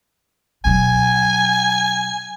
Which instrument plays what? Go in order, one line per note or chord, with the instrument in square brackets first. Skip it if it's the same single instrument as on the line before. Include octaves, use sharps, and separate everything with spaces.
[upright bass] B2 F#3 [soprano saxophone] G#5